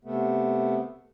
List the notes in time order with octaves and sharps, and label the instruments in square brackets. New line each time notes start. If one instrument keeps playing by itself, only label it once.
[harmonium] C3 A3 B3